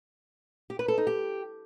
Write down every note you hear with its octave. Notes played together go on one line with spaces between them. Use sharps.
G4
B4
A4
D#4
G4